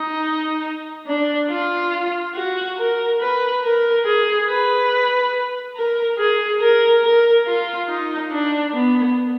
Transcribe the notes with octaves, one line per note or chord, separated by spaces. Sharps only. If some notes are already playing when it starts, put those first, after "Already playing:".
Already playing: D#4
D4
F4
F#4
A#4
B4
A#4
G#4
B4
A#4
G#4
A#4
A#4
F4
D#4
D4
B3